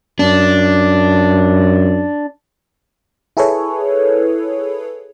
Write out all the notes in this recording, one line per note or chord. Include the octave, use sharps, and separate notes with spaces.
F#2 D4
E4 G#4 A4 B4 C#5